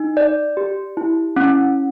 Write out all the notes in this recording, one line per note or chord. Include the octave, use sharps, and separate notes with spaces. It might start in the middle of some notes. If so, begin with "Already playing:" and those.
Already playing: D#4
D5
G4
E4
C#4